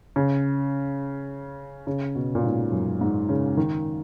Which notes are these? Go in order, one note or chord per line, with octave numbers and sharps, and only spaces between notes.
C#3
C#3
B2
A#2
G#2
F#2
G#2
C#3
D#3